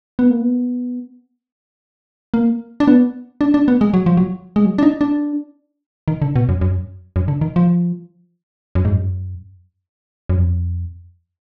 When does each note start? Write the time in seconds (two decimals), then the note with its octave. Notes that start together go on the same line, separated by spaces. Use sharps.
0.19 B3
0.30 A#3
0.42 B3
2.34 A#3
2.80 D4
2.88 B3
3.41 D4
3.54 D4
3.68 B3
3.81 G#3
3.94 F#3
4.06 F3
4.17 F#3
4.56 G#3
4.65 F#3
4.78 D4
4.83 D#4
5.01 D4
6.08 D#3
6.22 D3
6.36 B2
6.49 F#2
6.61 F#2
7.16 F#2
7.28 D3
7.41 D#3
7.56 F3
8.75 F#2
8.85 G#2
8.92 F#2
10.29 F#2
10.37 F2